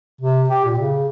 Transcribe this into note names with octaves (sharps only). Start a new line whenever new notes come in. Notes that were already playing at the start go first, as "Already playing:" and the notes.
C3
G4
A#2
C#3